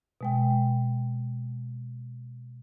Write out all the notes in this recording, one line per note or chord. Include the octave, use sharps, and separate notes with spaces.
B2 G#3 G5